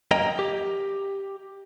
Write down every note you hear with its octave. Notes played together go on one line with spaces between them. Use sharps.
F#2 A#3 D#5 G5 A#5
G4